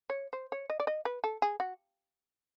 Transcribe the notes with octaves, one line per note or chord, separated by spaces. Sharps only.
C#5
C5
C#5
D#5
D5
D#5
B4
A4
G#4
F#4